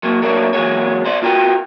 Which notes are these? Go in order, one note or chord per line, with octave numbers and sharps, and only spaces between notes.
F#3 A#3
F#3 A3 A#3 D4 A#4 C#5
E3 F#3 G#3 A#3 B3 C#5
B2 C5 D5
F4 F#4 A#4 B4 F5 G5